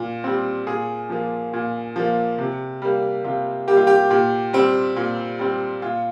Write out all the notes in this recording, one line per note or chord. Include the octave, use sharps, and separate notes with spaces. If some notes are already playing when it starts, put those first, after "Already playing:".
Already playing: A#2
G3 C4
A#2 G#4
F3 A#3
A#2
F3 A#3
C3
G3 A#3
C3 F4
G3 A#3 G4
F4
G4
A#2 G4
G3 C4
A#2
G3 C4
A#2 F4